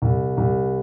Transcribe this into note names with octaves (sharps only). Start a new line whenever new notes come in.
C2
C2